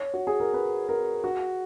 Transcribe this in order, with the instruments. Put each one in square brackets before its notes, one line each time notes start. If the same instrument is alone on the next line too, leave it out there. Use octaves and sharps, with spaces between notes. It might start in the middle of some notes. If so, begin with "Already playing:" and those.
Already playing: [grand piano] C#5
F#4
G#4
A#4
B4
A#4
F#4